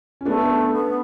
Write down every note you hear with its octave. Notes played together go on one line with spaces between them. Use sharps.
C#4
A3 B3 D4
B3